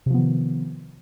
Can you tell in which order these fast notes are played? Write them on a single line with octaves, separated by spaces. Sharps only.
C3 F3 B3 D#3